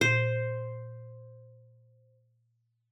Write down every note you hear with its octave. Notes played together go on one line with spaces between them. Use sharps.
A#2 C5